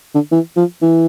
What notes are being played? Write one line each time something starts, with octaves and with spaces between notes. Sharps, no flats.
D3
E3
F3
E3